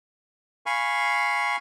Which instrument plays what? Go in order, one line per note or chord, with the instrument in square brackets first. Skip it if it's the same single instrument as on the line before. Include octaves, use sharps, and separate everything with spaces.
[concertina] F5 G#5 B5 C#6